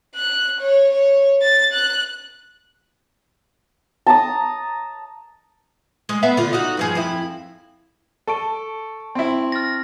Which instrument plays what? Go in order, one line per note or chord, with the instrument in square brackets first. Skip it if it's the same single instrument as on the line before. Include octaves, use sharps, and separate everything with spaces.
[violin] F#6
C#5
C#5
A6
F#6
[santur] A5 A#5 D#6
[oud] G#3
B3 E5 F5
D3 F4
D#4 F#4
G2 F3 G#4
F2 E4
[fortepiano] A4 [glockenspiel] A5 C#6 D7
[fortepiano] C4 E4
[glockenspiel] F6 A6 A#6